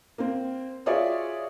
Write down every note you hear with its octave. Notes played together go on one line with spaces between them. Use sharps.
A#3 C4
F4 F#4 G#4 C#5 D5 E5